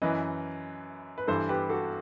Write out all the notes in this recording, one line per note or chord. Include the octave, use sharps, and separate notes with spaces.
F#2 E3 B4 D#5
B4
G2 E3 A4 C5
G4 B4
F#4 A4